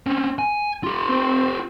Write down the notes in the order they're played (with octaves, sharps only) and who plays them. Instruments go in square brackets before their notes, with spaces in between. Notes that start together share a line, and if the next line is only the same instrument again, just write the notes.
[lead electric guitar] C4 C#4
G#5
F4 G4
[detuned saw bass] C4